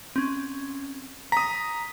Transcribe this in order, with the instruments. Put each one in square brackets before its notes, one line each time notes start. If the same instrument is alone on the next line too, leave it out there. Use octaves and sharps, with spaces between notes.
[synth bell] C4 C#4
[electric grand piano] A#5 D#6 [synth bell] B6